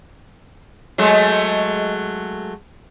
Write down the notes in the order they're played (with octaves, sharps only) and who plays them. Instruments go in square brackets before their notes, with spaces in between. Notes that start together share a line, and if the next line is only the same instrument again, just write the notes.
[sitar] F#3 G#3 A3